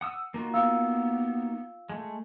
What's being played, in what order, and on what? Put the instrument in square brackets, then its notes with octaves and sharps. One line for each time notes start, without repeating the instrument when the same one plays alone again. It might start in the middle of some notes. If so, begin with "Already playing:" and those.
[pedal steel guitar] F#5 D#6 E6
[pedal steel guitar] A#3 D#4 F#4 [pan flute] F4
[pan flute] B3 [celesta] F4 F5 E6
[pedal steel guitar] G#3 A3